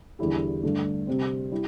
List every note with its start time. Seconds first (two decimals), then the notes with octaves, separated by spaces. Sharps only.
0.19 E2 D3 G3 E4 G4
0.63 G2 D3 A3
1.07 C3 G3 C4
1.52 G3 E4 G4